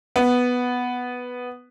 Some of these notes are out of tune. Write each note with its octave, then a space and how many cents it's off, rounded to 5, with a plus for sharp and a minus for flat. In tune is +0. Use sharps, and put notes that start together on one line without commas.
B3 +0